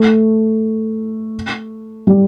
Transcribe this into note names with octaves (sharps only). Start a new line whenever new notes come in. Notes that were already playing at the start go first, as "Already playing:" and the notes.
Already playing: A3
G3